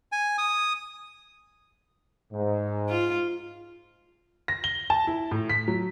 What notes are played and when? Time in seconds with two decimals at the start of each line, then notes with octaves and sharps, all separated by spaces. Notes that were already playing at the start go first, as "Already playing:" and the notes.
0.12 G#5
0.38 D#6
2.33 G#2
2.89 F4
4.48 A#6
4.64 G7
4.90 A5
5.07 E4
5.31 A2
5.49 B6
5.68 F#3